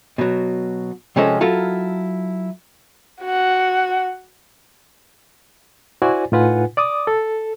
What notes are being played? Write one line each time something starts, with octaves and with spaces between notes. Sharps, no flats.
B2 F#3
C3 F3 G#3 C#4 A4
F#3 E4 F4 A4 A#4
F#4 F#5
E4 F#4 C5 D5 G#5
A2 D#4 F4 B4 F#5 G#5
D5 D6 D#6
A4